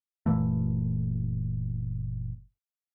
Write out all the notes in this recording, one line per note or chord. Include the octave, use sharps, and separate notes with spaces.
F#1 A#2 E3 A3